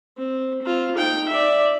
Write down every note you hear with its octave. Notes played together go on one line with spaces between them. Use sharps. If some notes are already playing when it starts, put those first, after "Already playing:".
C4
C4 F4
D#4 G5
D5 E5